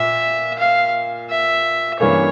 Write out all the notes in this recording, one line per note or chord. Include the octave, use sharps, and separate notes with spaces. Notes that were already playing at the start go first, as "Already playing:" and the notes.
Already playing: A#2 E5
F5
E5
G2 E3 A#3 C#4 C#5